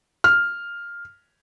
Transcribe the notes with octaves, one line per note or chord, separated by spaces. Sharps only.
F6